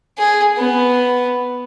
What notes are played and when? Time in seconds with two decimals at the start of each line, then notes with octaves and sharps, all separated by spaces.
0.18 G#4
0.57 B3